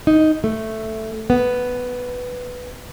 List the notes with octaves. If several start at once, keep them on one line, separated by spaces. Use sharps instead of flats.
D#4
A3
B3